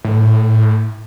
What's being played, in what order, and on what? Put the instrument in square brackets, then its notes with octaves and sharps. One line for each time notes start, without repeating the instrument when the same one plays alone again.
[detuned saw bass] A2